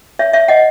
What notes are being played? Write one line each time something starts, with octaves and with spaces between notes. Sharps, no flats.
C#5 E5
C#5 E5
D#5 F#5